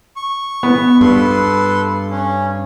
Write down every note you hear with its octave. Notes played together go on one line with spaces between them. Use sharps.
C#6
B3
G2 A4 B4 C6
C#4